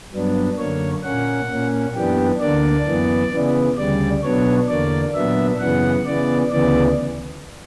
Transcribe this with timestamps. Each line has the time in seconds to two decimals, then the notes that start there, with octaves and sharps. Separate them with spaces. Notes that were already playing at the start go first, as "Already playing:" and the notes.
0.12 G2 F#3 B3 D4
0.58 F#2 D3 A#3 C#5
1.04 A#2 A#3 C#4 F#5
1.49 A#2 A#3 C#4
1.95 F#2 E3 B3 D4 G4
2.40 D2 D3 A#3 D4 D5
2.86 F#2 E3 B3
3.32 C#3 E3 B3
3.78 D2 C#3 G3 D5
4.23 B2 F#3 B3 D4 C#5
4.69 E2 D3 A#3 D5
5.14 A#2 F#3 B3 D4 E5
5.60 F#2 C#3 E3 B3 F#5
6.06 C#3 E3 B3 D5
6.51 D2 C#3 E3 B3 D5